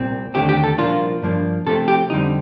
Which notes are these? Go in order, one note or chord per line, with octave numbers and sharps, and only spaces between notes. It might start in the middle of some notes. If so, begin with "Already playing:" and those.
Already playing: C2 A#2 C4
D#2 D3 A3 C4 G4
G4
A4
C2 A#2 F3 A#3 D4 F4
G2 F3 A#3 D4
C3 F3 A3 C4 A4
G4
F2 D3 G3 C4 D#4